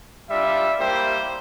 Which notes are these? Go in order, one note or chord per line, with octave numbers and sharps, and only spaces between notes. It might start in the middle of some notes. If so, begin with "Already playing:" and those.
G3 D4 F4 E5
G3 A#3 E4 G4 C5